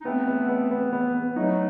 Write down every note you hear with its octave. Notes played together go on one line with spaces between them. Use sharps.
D#4
A3 B3 C4
B3
B3
B3
B3
B3
F#3 A3 D#4